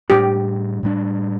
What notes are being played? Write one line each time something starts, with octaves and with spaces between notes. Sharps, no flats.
A2 G3 D4 G4
A2 G3 D4